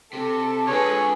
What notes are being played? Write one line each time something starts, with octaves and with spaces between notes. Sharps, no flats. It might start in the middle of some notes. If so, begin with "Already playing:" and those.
C3 A4
D3 G#3 G#4 B4 C#5